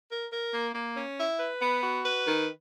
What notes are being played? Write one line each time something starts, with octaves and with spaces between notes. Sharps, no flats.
A#4
A#4
A#3
A#3
C#4
E4
B4
B3
F#4
B4
D#3